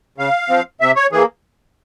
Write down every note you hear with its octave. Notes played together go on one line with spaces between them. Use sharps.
C#3 F5
F3 C4
C3 E5
C#5
E3 A#3 G#4